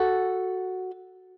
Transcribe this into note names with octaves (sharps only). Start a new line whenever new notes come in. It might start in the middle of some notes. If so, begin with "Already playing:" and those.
Already playing: F#4 A4